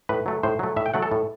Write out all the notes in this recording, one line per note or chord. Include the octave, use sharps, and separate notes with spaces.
A2 B4
F#3 A3
A2 C5
F#3 A3
A2 E5
G5
F#3 A3 F#5
A4
A2